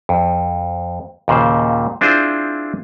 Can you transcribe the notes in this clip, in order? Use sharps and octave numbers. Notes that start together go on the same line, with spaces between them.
F2
D#2 A#2 C#3 C5
C4 D4 E4 F4 G#4 C5